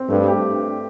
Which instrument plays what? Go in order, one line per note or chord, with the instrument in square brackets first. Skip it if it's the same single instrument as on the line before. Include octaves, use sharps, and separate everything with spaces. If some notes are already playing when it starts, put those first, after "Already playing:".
Already playing: [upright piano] C4
[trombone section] G2 [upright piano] A3
[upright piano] G4